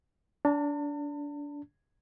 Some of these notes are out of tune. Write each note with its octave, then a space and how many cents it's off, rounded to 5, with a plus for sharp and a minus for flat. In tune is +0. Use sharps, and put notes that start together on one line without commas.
D4 -25 A5 +40